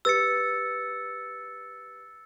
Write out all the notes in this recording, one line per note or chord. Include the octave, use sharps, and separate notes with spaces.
G4 B4 E6 A6 C#7